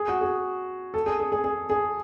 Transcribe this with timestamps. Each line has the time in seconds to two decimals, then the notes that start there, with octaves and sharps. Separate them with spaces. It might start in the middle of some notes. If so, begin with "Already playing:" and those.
Already playing: G#4
0.08 F#4
0.21 G#4
0.94 A4
1.06 G#4
1.20 G#4
1.32 G#4
1.44 G#4
1.70 G#4